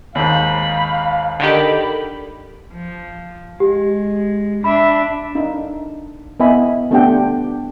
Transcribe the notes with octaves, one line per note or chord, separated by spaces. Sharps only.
D#2 G#2 F5 B5
D3 D#3 G4 B5
F3
G#3 G4
D4 E5 B5
D4 D#4 F5
B3 E4 D#5 E5 G#5 B5
A3 B3 D4 G4 F#5 G5